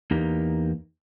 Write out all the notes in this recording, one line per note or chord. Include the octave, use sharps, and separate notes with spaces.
E2 A#3 D#4 G4